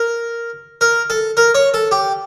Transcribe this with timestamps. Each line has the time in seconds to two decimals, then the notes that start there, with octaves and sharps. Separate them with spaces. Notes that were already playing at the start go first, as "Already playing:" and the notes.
Already playing: A#4
0.81 A#4
1.10 A4
1.37 A#4
1.55 C#5
1.74 A4
1.91 G4